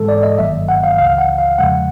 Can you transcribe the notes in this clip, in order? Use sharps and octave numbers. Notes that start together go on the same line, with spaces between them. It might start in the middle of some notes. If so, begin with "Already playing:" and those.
Already playing: G#2 E3 G#3 A4
D5
D#5
G1 G2 D#3 F#3 A#3 E5
F#5
F5
C#2 C#3 E3 F5
F#5
F5
E2 C#3 F3 G#3 F#5